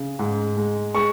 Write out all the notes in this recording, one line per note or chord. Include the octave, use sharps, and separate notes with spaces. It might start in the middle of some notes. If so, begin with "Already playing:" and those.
Already playing: C#3
G#2
G#3
G#3 C#6